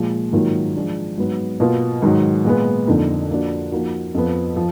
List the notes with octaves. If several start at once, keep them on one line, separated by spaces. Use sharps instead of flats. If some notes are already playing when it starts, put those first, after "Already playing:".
Already playing: A#2 F3 G#3
G#2 D#3 F#3 A#3 F4
F3 G#3 D4
G#2 F#3 B3
B2 A#3 F4
G#2 D#3 F#3
A#2 G#3 B3
F2 D3 F3 A#3 D#4
F3 A#3 D4 F#4
F3 A#3 D#4 F#4
F2 F3 B3
F3